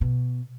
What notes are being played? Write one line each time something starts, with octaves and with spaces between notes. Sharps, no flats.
B2